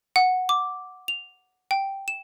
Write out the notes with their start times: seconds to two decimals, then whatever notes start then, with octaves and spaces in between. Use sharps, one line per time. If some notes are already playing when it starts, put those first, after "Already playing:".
0.16 F#5
0.49 D6
1.08 F7
1.71 G5
2.08 E7